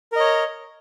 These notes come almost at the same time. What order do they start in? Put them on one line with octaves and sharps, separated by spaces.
A#4 D#5 C#5